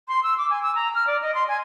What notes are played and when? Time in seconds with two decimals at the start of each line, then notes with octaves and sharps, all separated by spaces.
0.08 C6
0.23 E6
0.38 D6
0.50 G#5
0.63 E6
0.75 A#5
0.95 F6
1.07 D5
1.22 D#5
1.34 C6
1.48 G#5